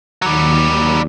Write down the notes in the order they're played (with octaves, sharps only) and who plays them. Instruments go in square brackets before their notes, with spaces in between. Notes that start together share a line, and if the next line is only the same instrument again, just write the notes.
[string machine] D#2 [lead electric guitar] F#3 G3